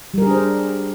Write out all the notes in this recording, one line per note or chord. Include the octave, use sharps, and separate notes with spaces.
G3 D4 G#4 A#4 C5